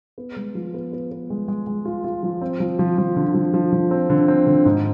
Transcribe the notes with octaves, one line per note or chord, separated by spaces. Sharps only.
B3
G#3
F3
B3
B3
B3
G#3
G#3
G#3
F4
F4
F3
C4
F3
F3
F3
D3
F3
F3
F3
C4
D3
C4
D3
G#2